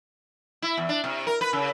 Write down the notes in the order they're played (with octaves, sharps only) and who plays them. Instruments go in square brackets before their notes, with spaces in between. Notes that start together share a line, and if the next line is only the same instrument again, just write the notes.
[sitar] E4
E2
D4
C3
A#4
B4
C#3